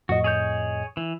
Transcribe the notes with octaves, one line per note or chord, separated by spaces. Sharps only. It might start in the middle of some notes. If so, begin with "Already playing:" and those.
F2 A2 F#4 D#5
G#4 C#5 G6
E3